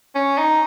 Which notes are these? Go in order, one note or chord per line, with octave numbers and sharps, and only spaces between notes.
C#4
D#4